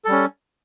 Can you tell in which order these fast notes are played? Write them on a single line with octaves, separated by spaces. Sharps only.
A4 G3 C#4